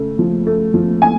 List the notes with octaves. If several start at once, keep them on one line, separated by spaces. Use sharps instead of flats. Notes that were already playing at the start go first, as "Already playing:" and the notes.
Already playing: C#3 A3
F3
A3
F3
G#5